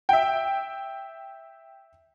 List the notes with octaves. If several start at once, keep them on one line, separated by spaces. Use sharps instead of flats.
E5 G5